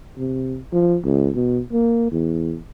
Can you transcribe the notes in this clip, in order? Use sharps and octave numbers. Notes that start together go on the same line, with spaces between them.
C3
F3
C#2
B2
A#3
E2